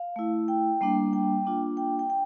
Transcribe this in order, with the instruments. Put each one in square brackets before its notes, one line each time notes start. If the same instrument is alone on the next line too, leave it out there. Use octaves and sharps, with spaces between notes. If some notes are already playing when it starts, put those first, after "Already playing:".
Already playing: [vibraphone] F5
A3 E4
G5
G3 A#3 D4
G5
A#3 D4 F4
G5
G5
G5